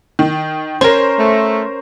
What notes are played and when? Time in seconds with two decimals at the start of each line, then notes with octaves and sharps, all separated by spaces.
0.19 D#3
0.81 C#4 A#4 C5
1.18 A3